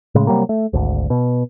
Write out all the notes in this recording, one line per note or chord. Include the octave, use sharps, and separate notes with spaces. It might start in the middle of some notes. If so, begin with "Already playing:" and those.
A2 C#3 G#3
C3 F#3 G3 A#3
A3
G#1 D2
B2